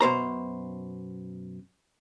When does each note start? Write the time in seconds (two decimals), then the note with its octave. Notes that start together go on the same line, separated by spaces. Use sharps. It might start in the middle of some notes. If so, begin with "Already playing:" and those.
0.01 F#2 B2 C5 A#5